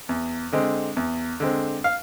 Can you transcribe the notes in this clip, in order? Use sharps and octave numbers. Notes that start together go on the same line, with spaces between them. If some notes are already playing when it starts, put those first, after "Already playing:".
E2
D3 G#3 C4
E2
D3 G#3 C4
F5